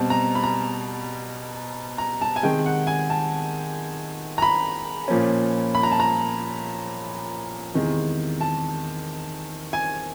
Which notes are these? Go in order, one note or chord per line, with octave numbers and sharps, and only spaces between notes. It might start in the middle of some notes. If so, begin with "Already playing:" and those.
Already playing: B2 G3 C4 A5
A#5
B5
A#5
A#5
A5
G#5
C3 D#3 G#3 G5
F#5
G#5
A5
A#5
B5
A#2 F3 A#3 C#4
B5
A#5
A5
A#5
E2 C3 D#3 G#3
A5
G#5